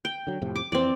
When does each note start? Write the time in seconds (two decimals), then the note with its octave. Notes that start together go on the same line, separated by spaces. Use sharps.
0.05 G5
0.27 D3 F#3
0.42 F2 A2 C3
0.56 D6
0.72 F2 E3 C4 D5